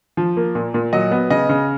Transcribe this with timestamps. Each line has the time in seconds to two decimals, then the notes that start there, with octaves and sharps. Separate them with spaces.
0.17 F3
0.37 A#3
0.55 A#2
0.74 A#2
0.93 F#3 D#5
1.11 B3
1.30 C#3 D#5
1.49 C#3